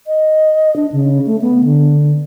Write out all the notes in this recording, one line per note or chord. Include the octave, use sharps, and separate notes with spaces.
D#5
D4
C#3
A3
B3
D3